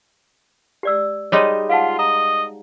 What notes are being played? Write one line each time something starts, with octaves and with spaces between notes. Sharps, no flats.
G4 D5 E6
G3 G#3 D#4 C#5
F4 F5 F#5 A5
D#5 A#5